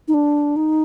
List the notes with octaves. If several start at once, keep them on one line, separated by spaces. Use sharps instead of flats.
D#4
D4
D#4